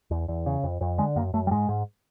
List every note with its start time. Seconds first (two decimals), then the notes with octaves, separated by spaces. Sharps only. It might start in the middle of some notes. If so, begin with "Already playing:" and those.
0.11 E2
0.28 E2
0.46 C#3
0.63 F2
0.81 F2
0.98 D3 G#3
1.16 F#2 A#3
1.34 F#2 A3
1.47 G3
1.51 G#2 G#3
1.69 G#2